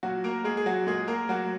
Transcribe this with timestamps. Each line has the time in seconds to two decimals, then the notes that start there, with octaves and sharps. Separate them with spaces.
0.03 A#2 F#3 F#4
0.24 A#3 A#4
0.44 G#3 A#3 G#4
0.57 G#4
0.66 F#3 F#4
0.87 A#2 G#3 G#4
1.08 A#3 A#4
1.29 F#3 A#3 F#4